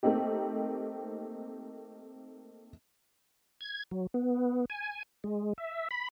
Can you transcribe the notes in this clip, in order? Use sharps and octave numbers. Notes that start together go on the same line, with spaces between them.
A3 A#3 C4 D#4 G4
G#6
F#3
B3
G#5
G#3
E5
B5